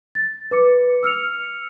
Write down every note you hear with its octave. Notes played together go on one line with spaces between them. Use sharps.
A6
B4 D6 C#7
E6 F6 C#7 F7